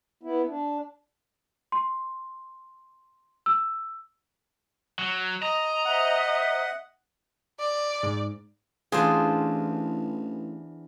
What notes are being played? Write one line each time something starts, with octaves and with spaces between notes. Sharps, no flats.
B3 E4
D4
C6
E6
F#3
D#5 A#5
C5 E5 F#5
D5
G#2
A1 E2 D4 F4 G#4 C5